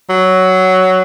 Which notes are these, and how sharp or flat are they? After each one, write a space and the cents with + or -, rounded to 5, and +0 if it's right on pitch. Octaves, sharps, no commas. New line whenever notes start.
F#3 +10